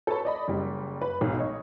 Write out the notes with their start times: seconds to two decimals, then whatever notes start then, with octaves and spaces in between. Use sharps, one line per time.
0.07 A4 B4 C#5 A5 B5
0.25 D5 D#5 B5
0.48 F#1 G3
1.02 B4
1.21 B1 G#2 B2
1.39 C#5 D#5